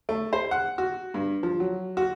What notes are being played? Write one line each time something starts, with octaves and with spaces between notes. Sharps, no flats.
A3
C5
F#5
F#4
G2
F3
F#3
F#4